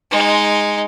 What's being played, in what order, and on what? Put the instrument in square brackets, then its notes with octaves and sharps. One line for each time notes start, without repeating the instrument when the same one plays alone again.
[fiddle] G#3 D#4